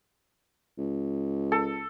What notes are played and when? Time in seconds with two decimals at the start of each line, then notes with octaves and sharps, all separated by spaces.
0.78 C#2
1.52 A4